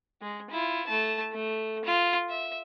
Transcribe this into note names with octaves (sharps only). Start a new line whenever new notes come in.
G#3
E4 F4
A3 A5
A3
F4
E5